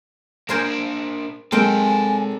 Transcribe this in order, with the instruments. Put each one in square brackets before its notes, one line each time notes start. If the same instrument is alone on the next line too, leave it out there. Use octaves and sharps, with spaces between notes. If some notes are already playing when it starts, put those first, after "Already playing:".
[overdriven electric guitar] A#3 D4 [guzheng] A#4 C5 G#5
[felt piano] G#3 [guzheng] C4 A#4 G5 [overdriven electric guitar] D#4 A4 [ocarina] G#5